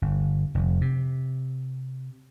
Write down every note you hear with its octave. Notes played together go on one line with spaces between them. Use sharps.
G1
F1
C3